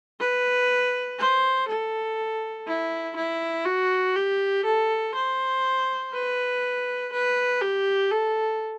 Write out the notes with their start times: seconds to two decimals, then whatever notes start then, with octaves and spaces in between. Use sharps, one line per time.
0.20 B4
1.19 C5
1.68 A4
2.67 E4
3.16 E4
3.65 F#4
4.16 G4
4.65 A4
5.15 C5
6.13 B4
7.13 B4
7.61 G4
8.11 A4